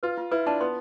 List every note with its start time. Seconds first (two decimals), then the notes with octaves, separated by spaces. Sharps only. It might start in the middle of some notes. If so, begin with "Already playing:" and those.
0.03 F4 B4
0.18 F4
0.31 E4 B4
0.46 D4 A5
0.61 B3 C6